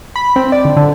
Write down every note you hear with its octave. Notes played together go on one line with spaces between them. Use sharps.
B5
C4
D5
D3
D3